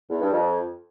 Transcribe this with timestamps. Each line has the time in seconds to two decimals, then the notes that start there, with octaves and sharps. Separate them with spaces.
0.10 E2
0.22 G2
0.33 F2